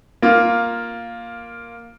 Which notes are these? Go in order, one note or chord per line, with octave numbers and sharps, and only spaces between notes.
A#3 F4